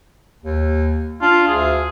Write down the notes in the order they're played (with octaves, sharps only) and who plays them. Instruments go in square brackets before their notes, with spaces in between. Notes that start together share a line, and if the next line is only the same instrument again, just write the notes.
[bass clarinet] D#2
[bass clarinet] D4 [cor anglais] F4
[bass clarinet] D2 [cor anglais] G#4